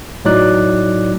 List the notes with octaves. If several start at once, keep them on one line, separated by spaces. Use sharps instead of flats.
A2 F#3 D#4 D5 F#6